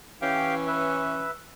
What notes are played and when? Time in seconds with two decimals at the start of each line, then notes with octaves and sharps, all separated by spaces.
0.22 E3 C#4 G4 F5 G5
0.67 B4 E5